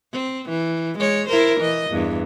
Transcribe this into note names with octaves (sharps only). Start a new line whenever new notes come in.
C4
E3
G#3 C#5
E4 A#4 C5
E3 D#5
E2 G2